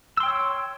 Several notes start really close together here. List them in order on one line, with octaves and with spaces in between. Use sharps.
E6 C6 G5 C#5